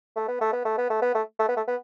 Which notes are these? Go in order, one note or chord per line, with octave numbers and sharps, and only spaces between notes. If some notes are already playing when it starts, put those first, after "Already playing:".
A3
B3
A3
B3
A3
B3
A3
B3
A3
A3
B3
A3
B3